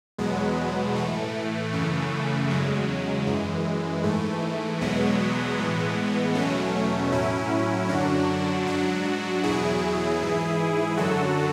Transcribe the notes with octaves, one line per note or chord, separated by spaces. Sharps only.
E2 B2 F#3 G#3 B3
A2 E3 A3
F#2 C#3 E3
E2 C#3 F#3 G#3
F#2 E3
G#2 E3 A3
E2 B2 F#3 G#3 B3
A2 E3
E2 B2 F#3 A3 C#4
A2 F#3 C#4 E4
F#2 D3 F#3 D4 F#4
G#2 F#3 D4 F#4
E2 B2 F#3 E4 G#4
G#2 E3
F#2 D3 F#3 F#4 A4